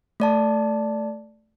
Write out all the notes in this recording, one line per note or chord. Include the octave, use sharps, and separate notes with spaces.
A3 D5 A5